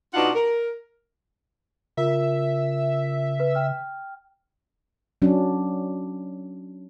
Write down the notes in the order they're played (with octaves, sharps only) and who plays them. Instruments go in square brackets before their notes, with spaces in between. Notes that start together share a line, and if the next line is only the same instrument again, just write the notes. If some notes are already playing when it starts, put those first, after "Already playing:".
[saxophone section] B2 D4 D#4 F4 F#5
A#4
[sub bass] C#3 [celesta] F4 A#4 [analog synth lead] E5
[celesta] B4
G5 F6
[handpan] F#3 C#4 D4